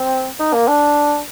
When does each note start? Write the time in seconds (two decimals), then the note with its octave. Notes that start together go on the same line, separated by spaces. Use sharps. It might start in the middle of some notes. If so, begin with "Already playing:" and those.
Already playing: C4
0.39 D#4
0.53 A#3
0.68 D4